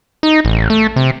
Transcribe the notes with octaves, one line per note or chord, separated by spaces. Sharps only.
D#4
A1
A3
C3